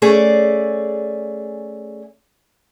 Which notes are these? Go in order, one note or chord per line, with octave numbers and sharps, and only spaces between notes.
A3 C#4 G#4 D5